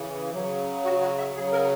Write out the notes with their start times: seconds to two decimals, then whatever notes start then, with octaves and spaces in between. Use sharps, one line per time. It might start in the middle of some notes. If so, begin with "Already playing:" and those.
Already playing: C#3 E3
0.34 C#3 F#3
0.84 F#4
1.02 F#4
1.18 E5
1.35 C#3 G#4
1.39 F#3
1.52 A#4